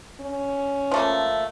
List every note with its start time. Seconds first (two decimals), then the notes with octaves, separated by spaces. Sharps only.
0.21 C#4
0.91 F3 A3 A#3